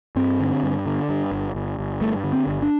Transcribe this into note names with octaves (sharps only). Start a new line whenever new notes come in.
G2 C4
D3
G2
D3
G2
G1
G1
G1
G2 A3
D3
C4
G1
D4